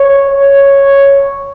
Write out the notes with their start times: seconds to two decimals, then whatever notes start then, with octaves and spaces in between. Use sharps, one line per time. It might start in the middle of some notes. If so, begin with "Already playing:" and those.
Already playing: C#5
0.31 C#5